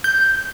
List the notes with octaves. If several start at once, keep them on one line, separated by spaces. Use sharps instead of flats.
G6